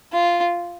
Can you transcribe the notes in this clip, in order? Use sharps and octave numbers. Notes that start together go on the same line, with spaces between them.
F4